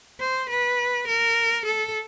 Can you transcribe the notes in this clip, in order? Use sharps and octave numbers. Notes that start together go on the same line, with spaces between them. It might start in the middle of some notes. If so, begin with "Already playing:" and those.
C5
B4
A#4
A4